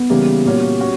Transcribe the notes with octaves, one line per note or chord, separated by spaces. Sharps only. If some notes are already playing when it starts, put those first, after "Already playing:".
Already playing: B3
C#3 E3 G3 A#3
A#2 A#3 C#4 F#4
C#4 F#4